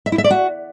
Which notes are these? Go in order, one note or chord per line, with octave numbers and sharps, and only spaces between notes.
E5
E4
E5
D5
F#4